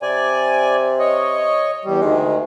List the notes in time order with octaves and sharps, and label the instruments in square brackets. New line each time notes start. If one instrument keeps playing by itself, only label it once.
[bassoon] C3 [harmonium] D5 G#5
[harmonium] C#5 D#5
E2 G3
[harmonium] D2 D#3 [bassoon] G#3